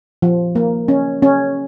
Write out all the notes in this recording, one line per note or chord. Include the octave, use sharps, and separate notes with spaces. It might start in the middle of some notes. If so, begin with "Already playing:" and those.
F3
A#3
C#4
C#4